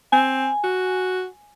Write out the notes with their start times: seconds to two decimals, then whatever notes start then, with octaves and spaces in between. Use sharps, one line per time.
0.12 C4 G#5
0.64 F#4